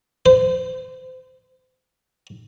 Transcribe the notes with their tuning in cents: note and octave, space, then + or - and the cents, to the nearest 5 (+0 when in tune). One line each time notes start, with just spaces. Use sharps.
C5 -30